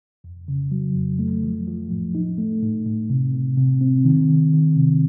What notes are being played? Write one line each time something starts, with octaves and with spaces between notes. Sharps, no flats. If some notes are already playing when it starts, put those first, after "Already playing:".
F2
C#3
F#3
F2
A3
F3
F3
A2
D#4
A3
A2
A2
C3
C3
C3
C4
D#3
D#3
D#3
C3